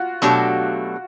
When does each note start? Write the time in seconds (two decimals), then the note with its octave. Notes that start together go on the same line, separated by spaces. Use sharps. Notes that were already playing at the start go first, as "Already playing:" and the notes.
Already playing: F4 F#4
0.22 B2 F#3 A3 D4 G4